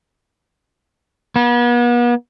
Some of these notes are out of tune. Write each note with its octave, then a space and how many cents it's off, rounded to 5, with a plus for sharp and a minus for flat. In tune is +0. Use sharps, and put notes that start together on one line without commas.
B3 -40